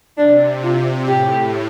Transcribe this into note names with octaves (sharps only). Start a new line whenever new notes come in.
C3 D4
F4
A2 G4